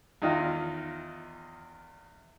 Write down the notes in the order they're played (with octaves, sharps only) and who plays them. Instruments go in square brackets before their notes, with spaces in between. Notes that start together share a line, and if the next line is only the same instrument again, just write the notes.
[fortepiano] E2 D#3 D#4 F4